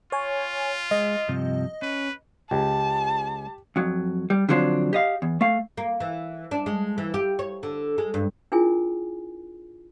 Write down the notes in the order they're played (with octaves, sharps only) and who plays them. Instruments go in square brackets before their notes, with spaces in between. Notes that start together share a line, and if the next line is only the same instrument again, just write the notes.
[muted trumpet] F4 [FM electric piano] C#5 G#5
[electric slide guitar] G#3 [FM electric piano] D#5
[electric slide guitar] G2 C3 F3
[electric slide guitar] C#4 [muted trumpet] B4
[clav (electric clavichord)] C#2 [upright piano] G4 [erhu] A5
[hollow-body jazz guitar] F2 F#3
G3
D3 F3 F#3 C4 D4
G4 D#5 F5
E2
A3 F5
[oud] A#3
E3
D4
G#3
E3
G4
C#5
D3
G#3
G2
[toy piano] D4 E4 F4 G#4 A#4 G#5